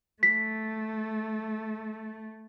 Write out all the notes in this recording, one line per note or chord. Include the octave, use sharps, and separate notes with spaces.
A3 B6